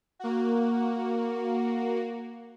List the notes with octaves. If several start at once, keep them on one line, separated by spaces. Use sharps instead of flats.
A#3 F#4